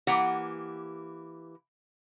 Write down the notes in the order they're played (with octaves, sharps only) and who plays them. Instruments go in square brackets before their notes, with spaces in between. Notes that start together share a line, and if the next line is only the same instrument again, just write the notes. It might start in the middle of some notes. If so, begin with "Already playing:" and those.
[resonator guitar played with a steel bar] E3 A#3 G4 F#5